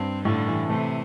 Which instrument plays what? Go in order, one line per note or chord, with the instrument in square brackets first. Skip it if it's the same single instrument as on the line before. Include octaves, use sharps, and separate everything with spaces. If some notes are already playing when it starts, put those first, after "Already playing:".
Already playing: [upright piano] G2 [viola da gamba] C4
[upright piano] A2 [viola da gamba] D3 G3
[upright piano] E3
[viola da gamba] C3 E3 [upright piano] A3